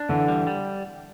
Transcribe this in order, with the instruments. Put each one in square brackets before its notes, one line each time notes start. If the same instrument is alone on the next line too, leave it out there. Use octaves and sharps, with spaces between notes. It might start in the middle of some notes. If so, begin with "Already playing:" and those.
Already playing: [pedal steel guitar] D4
[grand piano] D3 [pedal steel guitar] E3
[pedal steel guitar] G3
G3